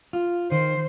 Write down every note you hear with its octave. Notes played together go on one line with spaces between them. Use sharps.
F4
D#3 C5